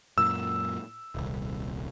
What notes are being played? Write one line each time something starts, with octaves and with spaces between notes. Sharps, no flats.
F#2 A#2 E6
D#1 C2